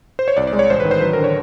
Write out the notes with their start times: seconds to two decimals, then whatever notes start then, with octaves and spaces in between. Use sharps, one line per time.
0.19 C5
0.28 C#5
0.37 C2 D5
0.47 D5
0.53 G#3
0.59 C#5
0.70 A1 C5
0.80 B4
0.85 D#3
0.91 C5
1.01 F#3 B4
1.13 A#4
1.18 D3
1.24 C#5